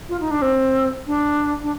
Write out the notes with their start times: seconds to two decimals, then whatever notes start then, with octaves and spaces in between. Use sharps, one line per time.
0.09 F4
0.20 D#4
0.31 D4
0.42 C4
1.07 D4
1.63 D4